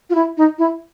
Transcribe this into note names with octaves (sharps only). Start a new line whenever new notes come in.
F4
E4
D#4
E4